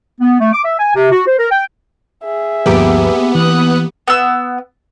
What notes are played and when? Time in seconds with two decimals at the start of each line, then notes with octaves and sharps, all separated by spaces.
0.21 B3
0.40 A3
0.53 D6
0.65 E5
0.79 G#5
0.96 C3
1.12 F#4
1.27 C5
1.39 A#4
1.51 G5
2.24 G#4 E5
2.66 D2 G2 F3 A#3 B3 G4
3.35 E3 D#6 F#6
4.08 B3 E6